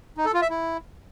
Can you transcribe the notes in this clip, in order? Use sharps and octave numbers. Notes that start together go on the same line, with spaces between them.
D#4
A4
F4
E5
E4